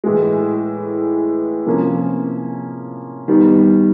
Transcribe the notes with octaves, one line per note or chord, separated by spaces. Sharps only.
A2 E3 G#3
C3 F3 A#3 C#4
D#3 G3 B3